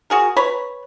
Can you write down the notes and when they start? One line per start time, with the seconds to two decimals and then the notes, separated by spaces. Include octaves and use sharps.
0.10 F#4 G#4 A#4
0.37 B4 C#5 A#5 B5